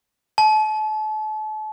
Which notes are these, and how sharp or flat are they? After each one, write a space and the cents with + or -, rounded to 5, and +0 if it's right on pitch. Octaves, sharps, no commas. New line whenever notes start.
A5 -35